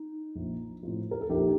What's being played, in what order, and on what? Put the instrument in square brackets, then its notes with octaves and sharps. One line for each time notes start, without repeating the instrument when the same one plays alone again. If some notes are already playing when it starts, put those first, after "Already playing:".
Already playing: [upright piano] D#4
A#1
A2 F3
A#4
A4
A#1 D#4 G4